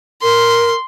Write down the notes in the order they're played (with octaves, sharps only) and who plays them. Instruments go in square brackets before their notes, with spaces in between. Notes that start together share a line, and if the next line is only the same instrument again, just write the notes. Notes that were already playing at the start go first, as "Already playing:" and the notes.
[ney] A#4 [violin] C6